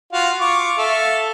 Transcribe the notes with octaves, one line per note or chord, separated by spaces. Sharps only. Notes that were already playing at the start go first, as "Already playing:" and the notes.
F4 F#4 F5
F4 C#6 D6
A4 E5 F5